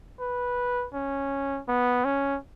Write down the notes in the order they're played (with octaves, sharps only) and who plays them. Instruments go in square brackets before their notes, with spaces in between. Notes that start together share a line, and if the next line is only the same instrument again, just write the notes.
[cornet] B4
C#4
B3
C#4